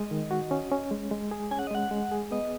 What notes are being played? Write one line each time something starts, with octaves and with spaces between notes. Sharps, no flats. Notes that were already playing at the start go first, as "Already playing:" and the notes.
Already playing: G#3 D#5
D#3
F#4
C#4
C#4
G#3
G#3
G#4
C#4 G#5
F#5
D#5
G#3 F#5
G#3
G#4
B3 D#5